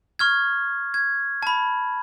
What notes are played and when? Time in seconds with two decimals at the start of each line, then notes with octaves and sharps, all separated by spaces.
0.19 C#6 F6 G#6
0.94 G#6
1.43 A5 B5